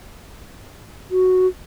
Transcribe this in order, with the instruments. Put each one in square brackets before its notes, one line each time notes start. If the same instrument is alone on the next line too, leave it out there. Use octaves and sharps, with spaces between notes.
[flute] F#4